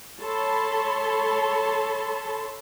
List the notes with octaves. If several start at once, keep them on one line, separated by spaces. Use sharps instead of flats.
A4 C#5 A5 B5 C6